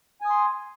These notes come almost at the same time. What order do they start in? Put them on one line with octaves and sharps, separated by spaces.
G#5 D#6 C6